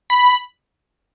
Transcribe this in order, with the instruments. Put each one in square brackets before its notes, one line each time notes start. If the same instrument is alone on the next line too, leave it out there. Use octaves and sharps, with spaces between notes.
[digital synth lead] B5